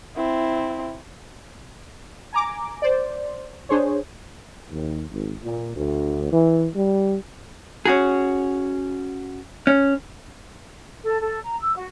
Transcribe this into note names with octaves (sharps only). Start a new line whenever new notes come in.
C4 E4
G#5 A#5 D6
C5 D5
D4 G#4 C5 C#5
D#2
G#1
A#2
D2
E3
G3
C#4 F#4 G#4
C#4
A4
A4
A#5
E6
F#4